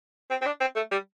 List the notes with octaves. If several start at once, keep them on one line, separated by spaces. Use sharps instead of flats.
C4
C4
D4
C4
A3
G3